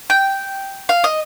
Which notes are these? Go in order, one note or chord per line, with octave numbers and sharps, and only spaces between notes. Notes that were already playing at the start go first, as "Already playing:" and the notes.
G5
F5
D#5